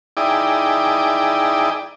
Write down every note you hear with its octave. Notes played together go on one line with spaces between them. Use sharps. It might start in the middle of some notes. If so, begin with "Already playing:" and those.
D#4 E4 G#4 D5 G5